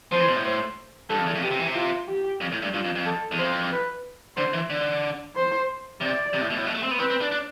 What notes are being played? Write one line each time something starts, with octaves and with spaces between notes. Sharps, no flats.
F3 C5
E3
B2
A2
C5
G2 A4
F2
E2
F2
B2 G4
C3
E3
C3
F4
G4
F2
A2
G2
G2 F4
F2
F2
A4
E2
F2 C5
B4
D3 C5
E3
D3
C5
C3 D5
C3
A2
B2
A2
B2
A3
C4
B3
C4 B4
C4
D4
D4